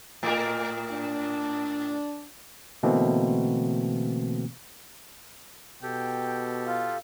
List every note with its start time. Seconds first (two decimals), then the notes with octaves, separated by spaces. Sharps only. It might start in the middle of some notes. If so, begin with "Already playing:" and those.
0.23 A2 A#4
0.92 D4
2.83 B2 D3 E3 A3 A#3 C4
5.83 B2 G4 A4 G5
6.67 F4 F5